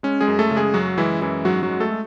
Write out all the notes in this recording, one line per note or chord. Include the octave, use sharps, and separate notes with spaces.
G#3 C#4
G#3 G#4
F#2
A3 A4
C#3
G#3 G#4
F#2 F#3 F#4
E3 G#3 E4
F#2 E3 E4
G#2 F#3 F#4
F#3 F#4
G#3
A3 A4
G#3